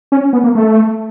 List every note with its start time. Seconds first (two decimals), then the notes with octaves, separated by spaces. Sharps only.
0.12 C#4
0.33 B3
0.44 A#3
0.55 A3